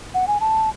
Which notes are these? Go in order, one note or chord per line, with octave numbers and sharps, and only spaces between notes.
F#5
G#5
A5